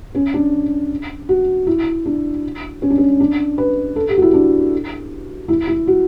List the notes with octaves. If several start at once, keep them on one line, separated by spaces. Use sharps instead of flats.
C#4
D4
F#4
E4
D4
C#4
D4
C#4
D4
B4
A4
G4
F#4
E4
D4
E4
E4
F#4